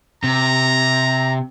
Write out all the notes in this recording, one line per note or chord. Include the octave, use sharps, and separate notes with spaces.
C3 A#5